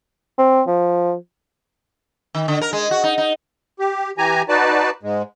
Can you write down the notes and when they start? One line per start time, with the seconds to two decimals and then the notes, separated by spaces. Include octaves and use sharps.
0.38 C4
0.67 F3
2.35 D#3
2.48 D3
2.61 A#4
2.73 G#3
2.91 F#4
3.04 D#4
3.18 D#4
3.79 G4
4.18 E3 G4 G#5 A#5
4.49 D#4 F#4 B4 D5 A5
5.03 G#2 G#3